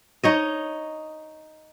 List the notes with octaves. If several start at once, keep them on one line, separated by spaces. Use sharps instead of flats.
D#4 C#5 D#5